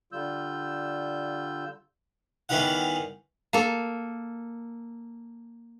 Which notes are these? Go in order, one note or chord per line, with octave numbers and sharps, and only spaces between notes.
D3 G3 F4 E6 G6
E2 D#3 E3 G3 D#4 F#5
A#3 A4